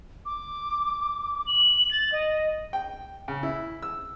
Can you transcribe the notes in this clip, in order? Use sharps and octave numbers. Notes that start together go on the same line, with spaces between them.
D6
F#7
A6
D#5
G5
C#3
E4
E6